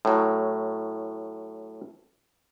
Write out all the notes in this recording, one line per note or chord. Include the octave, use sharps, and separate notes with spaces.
A2 F#3